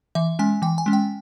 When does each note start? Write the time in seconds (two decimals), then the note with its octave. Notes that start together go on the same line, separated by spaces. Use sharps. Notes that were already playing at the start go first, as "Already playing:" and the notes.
0.15 E3 E5
0.39 G#3 C#4 G#5
0.62 E3 G5
0.78 G#5
0.86 G#3 C#4
0.93 G5